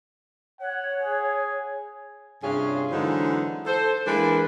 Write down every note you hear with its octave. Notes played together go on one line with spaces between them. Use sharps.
C#5 F#5
G#4
G2 C3 C#4 F4 G#4
D3 E3 F#3 G#3 C4 D#4
A4 C5
E3 G#3 A#3 D4 A#4 B4